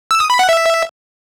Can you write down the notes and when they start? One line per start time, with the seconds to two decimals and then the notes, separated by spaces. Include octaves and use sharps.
0.11 E6
0.20 D#6
0.30 B5
0.39 F#5
0.49 E5